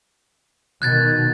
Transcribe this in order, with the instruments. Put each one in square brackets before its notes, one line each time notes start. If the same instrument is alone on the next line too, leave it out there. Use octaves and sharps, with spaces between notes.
[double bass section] B2 D#3 [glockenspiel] F#6 G#6 A6